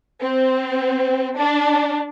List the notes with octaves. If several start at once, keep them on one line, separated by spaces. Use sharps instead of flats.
C4
D4